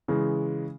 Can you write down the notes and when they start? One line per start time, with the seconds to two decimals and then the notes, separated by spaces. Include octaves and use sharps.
0.08 C#3 E3 G#3